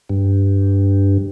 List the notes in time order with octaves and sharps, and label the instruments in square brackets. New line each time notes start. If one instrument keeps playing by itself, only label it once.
[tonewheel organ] G2